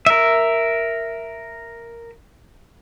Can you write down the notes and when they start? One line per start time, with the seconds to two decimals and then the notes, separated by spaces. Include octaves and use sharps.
0.06 A#4 E5